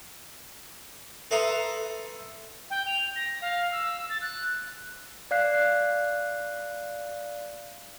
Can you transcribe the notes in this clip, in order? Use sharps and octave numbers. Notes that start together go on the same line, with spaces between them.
A4 B4 E5 A#5 C6 D#6
G5
F7
A#6
F5
E6
A6
F#6
D5 F5 F#6 C7